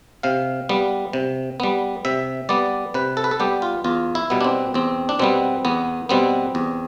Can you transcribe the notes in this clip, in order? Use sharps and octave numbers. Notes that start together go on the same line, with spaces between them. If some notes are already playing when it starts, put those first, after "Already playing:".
C3 F5
G3 B3
C3
G3 B3
C3 E5
G3 B3 D5
C3 B4
A4
B4
A4
G3 B3 G4
F4
E2 F4
E4
B2 G3 B3
D4
C4
E2 C4
D4
B2 G3 B3 C4
E2 B3
B2 G3 B3 C4
E2